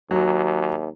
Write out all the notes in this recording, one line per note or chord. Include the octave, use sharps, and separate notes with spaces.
D#2 F#3